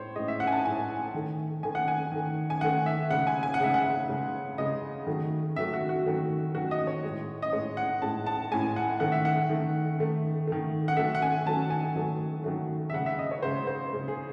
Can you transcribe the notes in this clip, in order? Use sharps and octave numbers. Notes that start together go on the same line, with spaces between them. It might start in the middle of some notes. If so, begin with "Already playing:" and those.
Already playing: A2 G#3 C5 C#5
A2 G#3 D#5
E5
F#5
G#5
A5
A2 G#3 G#5
D#3 A3
D#3 A3 G#5
F#5
G#5
D#3 A3
G#5
D#3 A3 F#5
E5
C#3 G#3 F#5
G#5
G#5
F#5
C#3 G#3 E5
F#5
C#3 G#3
C#3 G#3 D#5
D#3 F#3 A3
D#3 F#3 A3 E5
F#4
F#4
D#3 F#3 A3
D#3 F#3 A3 F#4
D#5
C#5
A2 G#3
D#5
A2 G#3 C#5
F#5
A2 G#3 A5
A5
A2 G#3 G#5
F#5
D#3 A3 F#5
E5
F#5
D#3 A3
D#3 A3
D#3 A3
F#5
D#3 F#3 A3 E5
F#5
G#5
D#3 F#3 A3 A5
G#5
D#3 F#3 A3
D#3 F#3 A3
E5
C#3 F#5
G#3
E5
D#5
C#5
C#3 G#3 C5
C5
C#3 G#3
G#4